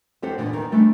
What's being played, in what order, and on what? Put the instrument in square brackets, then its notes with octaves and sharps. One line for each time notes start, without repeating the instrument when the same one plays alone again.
[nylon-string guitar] F2 C4 G4 A4 F#5
E2 A#2 D3
E2 D#3
G3 A3 C#4 D4